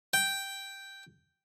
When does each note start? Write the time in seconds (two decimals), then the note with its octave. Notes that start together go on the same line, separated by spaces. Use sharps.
0.14 G5